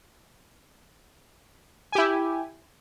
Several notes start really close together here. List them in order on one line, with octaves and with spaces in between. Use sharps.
G#5 G4 E4